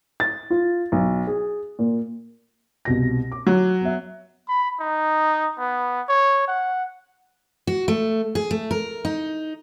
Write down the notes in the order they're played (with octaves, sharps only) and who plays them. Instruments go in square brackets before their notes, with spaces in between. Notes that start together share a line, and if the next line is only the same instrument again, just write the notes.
[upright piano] A6
F4
B1
G#4
A#2
[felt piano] C2 B2 A#6
D6
[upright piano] F#3
[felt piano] B3 E5
[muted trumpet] B5
D#4
B3
C#5
F#5
[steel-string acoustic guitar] F#4
A3
G#4
A3
A#4
D#4